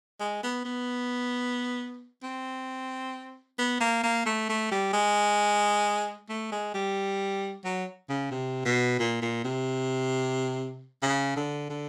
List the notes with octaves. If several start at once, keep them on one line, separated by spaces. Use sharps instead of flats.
G#3
B3
B3
C4
B3
A#3
A#3
A3
A3
G3
G#3
A3
G#3
G3
F#3
C#3
C3
B2
A#2
A#2
C3
C#3
D3
D3